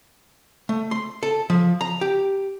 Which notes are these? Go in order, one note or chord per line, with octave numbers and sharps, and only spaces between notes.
A3
C6
A4
F3
A#5
G4